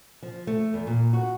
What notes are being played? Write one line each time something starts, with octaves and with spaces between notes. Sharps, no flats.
F3
A3
E2
A#2
F#4